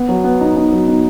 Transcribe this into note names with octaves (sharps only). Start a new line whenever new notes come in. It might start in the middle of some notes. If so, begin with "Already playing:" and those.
Already playing: B3
F#3
B3
D#4
D#4
F#3
D#4